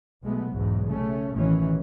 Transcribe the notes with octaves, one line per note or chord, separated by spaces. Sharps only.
B1 G#3 A3 B3
B1 E2 G#2
C#3 A3 C#4
A1 B2 D#3 E3 C#4